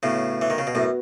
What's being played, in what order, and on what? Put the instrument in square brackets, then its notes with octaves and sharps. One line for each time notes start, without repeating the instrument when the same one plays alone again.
[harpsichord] A2 C#3 [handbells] B3 F#4 B4
[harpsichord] E3
D#3
C#3
B2
[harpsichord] F#2 A2 [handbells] B3 F#4 B4